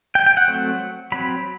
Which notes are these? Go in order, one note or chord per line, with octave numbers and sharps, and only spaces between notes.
G5
G5
F#5
F#3 A3 C4
F#3 C4 B5